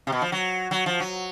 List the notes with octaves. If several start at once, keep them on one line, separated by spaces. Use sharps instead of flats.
C3
B2
F3
F#3
F#3
F3
F#3